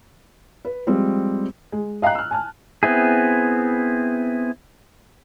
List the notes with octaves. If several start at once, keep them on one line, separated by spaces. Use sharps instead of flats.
B4
F3 G3 G#3 C4
G#3
D#5 F5 G5 A#5 F#6
E6 F6
G#5 A5 F6
B3 C4 E4 G#4